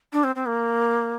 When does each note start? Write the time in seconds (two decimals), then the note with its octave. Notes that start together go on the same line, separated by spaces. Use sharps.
0.12 D4
0.24 C4
0.35 C4
0.46 A#3